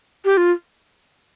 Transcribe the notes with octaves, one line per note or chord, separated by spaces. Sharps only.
G4
F4